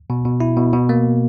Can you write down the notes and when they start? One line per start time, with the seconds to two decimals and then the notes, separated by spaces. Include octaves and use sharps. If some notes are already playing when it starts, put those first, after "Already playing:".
0.10 B2
0.25 B2
0.40 E4
0.57 B2
0.73 B2
0.89 A#3